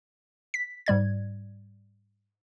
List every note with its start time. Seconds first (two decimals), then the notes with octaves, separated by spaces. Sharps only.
0.54 B6
0.86 G#2 G3 D5 G#6